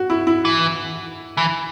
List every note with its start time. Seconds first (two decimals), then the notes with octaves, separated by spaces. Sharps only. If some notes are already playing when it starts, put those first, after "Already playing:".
Already playing: F#4
0.10 E4
0.27 E4
0.45 E3
1.37 E3